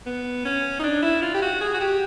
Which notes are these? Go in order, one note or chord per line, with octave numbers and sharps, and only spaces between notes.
B3
C#4
D#4
D4
E4
F4
G4
F#4
G#4
F#4
G4